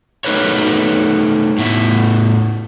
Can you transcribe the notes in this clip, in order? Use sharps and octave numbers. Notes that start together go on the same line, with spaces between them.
A3 B3 D#4 A#4 B4 C#5
A2 B3 E5